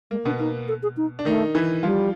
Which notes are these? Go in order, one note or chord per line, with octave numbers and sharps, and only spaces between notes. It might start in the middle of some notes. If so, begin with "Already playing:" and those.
G#3 A#3
B2 B3 D4
A#3 D#4
A4
G#4
D#4
D4
D#3 A3 D#4
E3 E4
F3 G3 F4